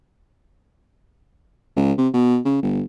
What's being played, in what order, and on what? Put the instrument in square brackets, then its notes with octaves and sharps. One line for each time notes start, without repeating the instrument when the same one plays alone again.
[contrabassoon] C#2
C3
B2
C#3
G1